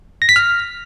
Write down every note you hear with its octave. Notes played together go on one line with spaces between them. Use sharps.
A#6
B6
F6